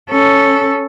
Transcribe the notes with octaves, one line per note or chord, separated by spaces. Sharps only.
C#4 A4